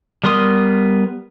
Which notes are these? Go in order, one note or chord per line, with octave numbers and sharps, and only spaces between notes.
G3 B3 A#4 C6 D#6